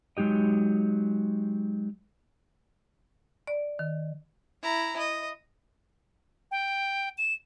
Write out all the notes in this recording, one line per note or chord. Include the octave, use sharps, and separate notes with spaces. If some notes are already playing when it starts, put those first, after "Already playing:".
F#3 G#3 D#4 G4 D#5
D5
D#3
E4 A#5
D#5
G5
E7